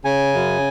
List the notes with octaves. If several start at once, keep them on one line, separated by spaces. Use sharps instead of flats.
C#3 G#5
F#2